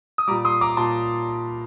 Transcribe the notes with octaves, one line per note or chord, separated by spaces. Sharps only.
D#6
A#2 G3 A#5 D6
C6 D#6
A#5 D6
A#2 A5 C6